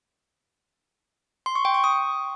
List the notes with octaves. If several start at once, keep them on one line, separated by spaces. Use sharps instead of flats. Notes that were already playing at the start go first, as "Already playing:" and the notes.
C6
C#6
G5
C#6
D#6